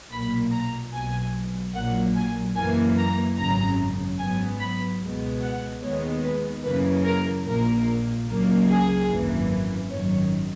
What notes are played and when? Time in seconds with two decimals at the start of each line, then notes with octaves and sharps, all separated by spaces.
0.11 B1 A#2 A#3 B5
0.52 A#5
0.93 B1 B2 F#3 G#5
1.74 A#1 A#2 F#3 A#3 F#5
2.15 G#5
2.56 F#2 E3 A#3 G#5
2.98 A#5
3.38 G#1 F#2 C#3 A#5
4.19 G#2 F#3 B3 G#5
4.60 B5
5.01 C#2 B2 G#3 B3
5.42 F#5
5.82 D#2 D#3 G#3 B3 C#5
6.23 B4
6.64 F#2 C#3 E3 A#3 B4
7.05 A#4
7.45 A#1 A#2 A#3 A#4
8.27 C#2 C#3 F#3 A#3
8.68 G#4
9.10 G#1 F#2 E3 A#3
9.91 G#1 F#2 D#3 F#3 C#5